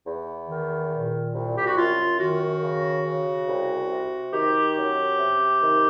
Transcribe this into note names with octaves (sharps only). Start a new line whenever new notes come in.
E2
D#3
A#2
C2
G4
F#4
F#2 F4
D#3 F#4
C#3
C#3
C2
C3
D#3 G4
F#2
C3
D#3